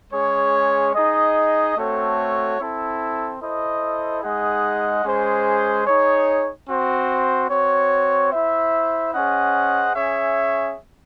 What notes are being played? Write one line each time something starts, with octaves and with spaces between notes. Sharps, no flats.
G#3 C#4 G#4 C#5
D#4 G#4 D#5
A3 C4 F#4 A4 C#5
C4 E4 A4
E4 A4 C5 D#5
G#3 D#4 G#4 D#5 F#5
G#3 C#4 G#4 C5
D#4 G#4 C#5
C4 F#4 C5
C4 F#4 C#5
E4 C5 E5
C#4 G#4 C5 D#5 F#5
C#4 G#4 C#5 E5